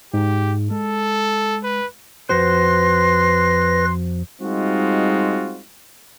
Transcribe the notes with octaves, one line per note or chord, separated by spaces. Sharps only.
G#2 G4
G#3 A4
B4
F2 F#4 B4 C5 C6 A#6
G3 G#3 C4 D#4 F4 F#4